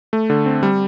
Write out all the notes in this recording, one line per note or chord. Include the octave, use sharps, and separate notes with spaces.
A3
D3
C4
G3